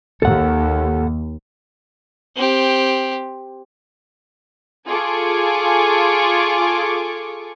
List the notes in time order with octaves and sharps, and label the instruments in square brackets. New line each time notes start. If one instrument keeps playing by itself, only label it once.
[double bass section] D#2 [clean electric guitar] A4 F#5
[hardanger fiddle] C4 G4
[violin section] F4 G#4 A4 G#5 C#6 D6